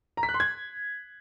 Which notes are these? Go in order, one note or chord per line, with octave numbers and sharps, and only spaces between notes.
A#5
B6
F#6
C6
G#6